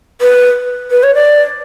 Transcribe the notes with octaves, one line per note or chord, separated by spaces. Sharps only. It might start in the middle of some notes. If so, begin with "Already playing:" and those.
B4
B4
C#5
D5